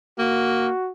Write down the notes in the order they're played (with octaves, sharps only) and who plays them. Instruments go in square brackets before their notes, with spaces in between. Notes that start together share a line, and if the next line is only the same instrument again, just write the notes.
[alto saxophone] A#3 [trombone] F#4